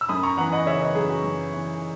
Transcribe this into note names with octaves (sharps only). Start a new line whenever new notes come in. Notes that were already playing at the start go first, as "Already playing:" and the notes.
E6
F#2 B5 D#6
A#5 C#6
E3 F#5 A#5
D#5 F#5
C#3 C#5 E5
B4 D#5
F#2 G#4
F#4
F#2
E3